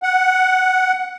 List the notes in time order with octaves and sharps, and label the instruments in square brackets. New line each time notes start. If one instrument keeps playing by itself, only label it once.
[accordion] F#5